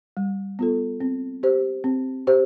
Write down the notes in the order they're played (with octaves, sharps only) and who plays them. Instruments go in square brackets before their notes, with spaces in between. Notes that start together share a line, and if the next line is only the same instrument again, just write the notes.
[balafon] G3
B3 F4 A4
C4
G4 C5
C4
G4 C5